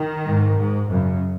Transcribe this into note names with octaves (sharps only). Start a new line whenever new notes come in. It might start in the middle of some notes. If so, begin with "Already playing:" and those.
Already playing: D#3
G#2
G#2
F#2 C#3